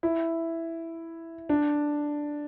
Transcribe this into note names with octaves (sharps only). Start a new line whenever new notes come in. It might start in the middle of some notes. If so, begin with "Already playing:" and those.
E4
D4